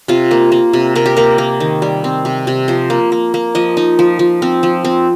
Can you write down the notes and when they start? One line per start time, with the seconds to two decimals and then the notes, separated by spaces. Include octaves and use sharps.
0.08 C3 F4
0.31 A#3
0.52 A#3
0.73 C3
0.95 C3 A#4
1.06 G4
1.17 A#3 A#4
1.38 A#3
1.60 D#3
1.82 G3
2.04 C4
2.25 C3
2.47 C3
2.68 F3 C5
2.90 A#3
3.12 A#3
3.34 A#3
3.55 F3 D#5
3.77 D#4
3.99 F3
4.19 F3
4.42 C4
4.63 F3
4.85 C4